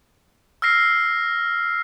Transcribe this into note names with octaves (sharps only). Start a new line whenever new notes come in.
E6 F6 A#6 C7